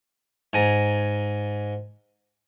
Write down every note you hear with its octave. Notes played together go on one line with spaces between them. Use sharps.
G#2 G#5 A#5